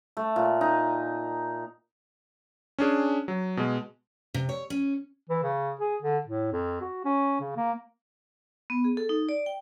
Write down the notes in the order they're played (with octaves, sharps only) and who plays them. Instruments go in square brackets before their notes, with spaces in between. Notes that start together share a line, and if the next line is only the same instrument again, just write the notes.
[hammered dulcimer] A3
A#2
D#4
[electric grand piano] C#4 D4 G#4
F#3
B2 G#3
[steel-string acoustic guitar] C3
C#5
C#4
[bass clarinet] E3
C#3
G#4
D3
A2
F2
F#4
C#4
C#3
A#3
[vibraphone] B3
G#4
A4
D#4
D5
G5